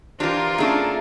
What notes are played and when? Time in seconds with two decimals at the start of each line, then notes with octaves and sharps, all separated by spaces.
0.20 E3 D4 F4 G4 A#4 C5 A#5
0.58 A3 C#4 D4 G#4 A4